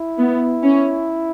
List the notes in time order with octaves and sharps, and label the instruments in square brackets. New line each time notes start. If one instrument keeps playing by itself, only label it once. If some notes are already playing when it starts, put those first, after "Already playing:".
Already playing: [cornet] E4
[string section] B3
C#4